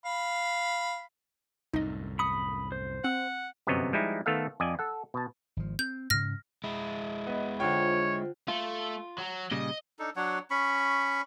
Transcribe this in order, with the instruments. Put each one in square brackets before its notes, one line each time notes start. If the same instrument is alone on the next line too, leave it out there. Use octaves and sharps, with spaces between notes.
[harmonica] F5 B5
[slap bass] C2 F#2 A2 [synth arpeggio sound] D#4 D#5
[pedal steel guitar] B5 D#6 [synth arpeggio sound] C#7
[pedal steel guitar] C5
[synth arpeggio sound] C4 [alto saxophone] F#5
[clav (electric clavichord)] G1 F#2 C3 B3 C#5 D#5
F3 G3 G#3 D#4 E4
D#3 A3 B3 A4 E5 F5
F2 D5 D#5 G#5
A4 F#5
B2 A5
[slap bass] G#1 F3
[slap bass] C4 [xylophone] G6
[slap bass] G#2 C#3 [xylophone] F6 A#6
[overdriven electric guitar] G#3 E4
[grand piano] B3 D#5
[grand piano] D3 G5 [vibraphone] F4 C5 [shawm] C#5
[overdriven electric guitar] A3 [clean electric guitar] F4
[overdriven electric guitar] F#3
[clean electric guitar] A#2 C#3 G3 [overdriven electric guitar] D#5
[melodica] D4 D#4 A4
F#3 D4 C#5 F#5
C#4 B5 C#6